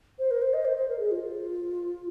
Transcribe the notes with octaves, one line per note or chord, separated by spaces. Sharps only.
C5
A#4
C5
D#5
C5
C5
A#4
G#4
F4